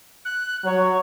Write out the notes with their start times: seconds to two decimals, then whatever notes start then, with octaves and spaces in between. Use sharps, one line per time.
0.25 F#6
0.65 F#3 C#5